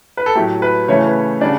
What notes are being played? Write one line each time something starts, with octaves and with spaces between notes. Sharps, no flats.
B4
A4
A2 F#3 A3 G4
B4
C#3 E3 A3 C#4 C#5
B4
C#3 G3 D4 D5